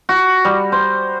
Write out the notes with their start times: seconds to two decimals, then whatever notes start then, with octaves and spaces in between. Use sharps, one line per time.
0.09 F#4
0.45 G3
0.72 C5